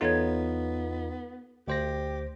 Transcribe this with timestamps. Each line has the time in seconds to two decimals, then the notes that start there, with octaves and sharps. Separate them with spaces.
0.01 E2 B3 D#4 F4 A4 C#5 G#6
1.68 D2 G4 C5 A#6